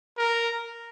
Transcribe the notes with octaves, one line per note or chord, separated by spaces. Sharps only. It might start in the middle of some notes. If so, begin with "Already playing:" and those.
A#4